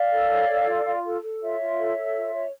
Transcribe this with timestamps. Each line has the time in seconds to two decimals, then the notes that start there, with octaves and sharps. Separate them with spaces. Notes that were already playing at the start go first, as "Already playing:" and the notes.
Already playing: D5 F5
0.11 A4
0.29 C#5
0.48 A4
0.67 F4
0.85 F4
1.04 A4
1.23 A4
1.41 F4 C#5 E5
1.59 F4
1.78 A4
1.96 A4
2.15 F4
2.33 C#5